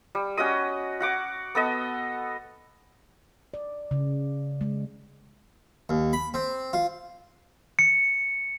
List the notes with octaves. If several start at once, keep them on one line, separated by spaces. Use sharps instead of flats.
G3
C#4 F#4 D#5 D#6
F#4 F#5 D6
B3 A4 D#5
D5
C#3
G#3
D#2
B5
C4
F4
C#7